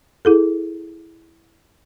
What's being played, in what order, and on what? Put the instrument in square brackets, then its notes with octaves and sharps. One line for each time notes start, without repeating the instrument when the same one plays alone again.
[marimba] E4 G#4 A4